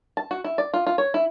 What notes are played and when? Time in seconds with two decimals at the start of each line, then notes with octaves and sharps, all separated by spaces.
0.17 A5
0.31 F#4
0.44 E4
0.58 D5
0.74 F4
0.87 F4
0.98 C#5
1.14 E4